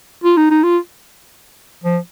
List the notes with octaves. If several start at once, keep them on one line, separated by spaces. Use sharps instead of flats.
F4
D#4
D#4
F4
F3